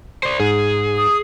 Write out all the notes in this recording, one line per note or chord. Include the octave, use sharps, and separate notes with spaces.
C5 D5
G#2 G#4
D#6